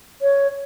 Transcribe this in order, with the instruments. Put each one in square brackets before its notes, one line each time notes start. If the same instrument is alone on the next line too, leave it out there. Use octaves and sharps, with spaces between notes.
[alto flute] C#5